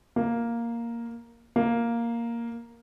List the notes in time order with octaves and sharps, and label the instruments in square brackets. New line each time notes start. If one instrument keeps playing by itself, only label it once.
[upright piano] A#3
A#3